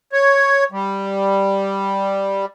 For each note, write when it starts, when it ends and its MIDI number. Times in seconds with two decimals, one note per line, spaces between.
0.13 0.64 73
0.72 2.45 55